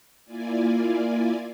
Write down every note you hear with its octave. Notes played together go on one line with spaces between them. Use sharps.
A#3 E4 F4 D5 G#5